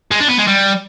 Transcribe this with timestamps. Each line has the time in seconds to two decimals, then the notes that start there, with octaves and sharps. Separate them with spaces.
0.11 G#3
0.20 D4
0.29 B3
0.38 G#3
0.47 G3